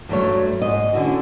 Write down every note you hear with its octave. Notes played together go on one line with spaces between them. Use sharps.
G2 F#3 A3 C#5
G#2 D#5
D3 C#4 E4 F#4